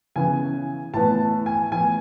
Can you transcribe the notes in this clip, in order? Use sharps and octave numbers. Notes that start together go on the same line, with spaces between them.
C#3 E3 B3 G#5
A2 E3 B3 A5
G#5
A2 E3 B3 G#5